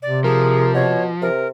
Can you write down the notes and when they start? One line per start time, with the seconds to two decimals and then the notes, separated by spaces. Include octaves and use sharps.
0.02 C3 D5
0.24 F3 G#4 A#4
0.74 B2 C#5
1.22 C3 A#4